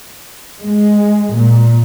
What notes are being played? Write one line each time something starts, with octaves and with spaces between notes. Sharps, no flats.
G#3
A#2